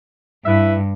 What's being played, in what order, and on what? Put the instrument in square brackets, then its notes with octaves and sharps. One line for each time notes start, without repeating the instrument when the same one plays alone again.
[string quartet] G2 [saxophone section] E4 B4 E5